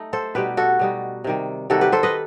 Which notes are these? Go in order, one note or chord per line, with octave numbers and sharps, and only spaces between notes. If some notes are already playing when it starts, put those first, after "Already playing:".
Already playing: A3 D#4
A4 C5
B2 G3 D#4 G4 B4
F#4 A4
B2 G3 D#4
C3 D#3 G3
C3 D#3 G3 F#4 A4
G4 B4
A4 C5
B4 D#5